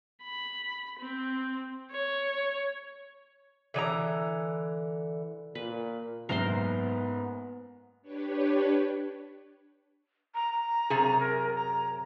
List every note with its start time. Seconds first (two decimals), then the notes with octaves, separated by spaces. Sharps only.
0.23 B5
1.00 C4
1.91 C#5
3.74 D3 E3 D#5 A#5
5.55 A#2 B4
6.29 F#1 G#2 B3 A#4 C5 C6 C7
8.02 D4 G4 B4 C#5
10.35 A#5
10.90 F#2 C3 G#4
11.20 A#4
11.55 A#5